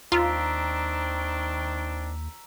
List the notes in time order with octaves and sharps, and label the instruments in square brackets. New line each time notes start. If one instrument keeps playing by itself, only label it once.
[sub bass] D#2 [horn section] D#3 C4 D4 [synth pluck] F4 [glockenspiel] A#5 E6 B6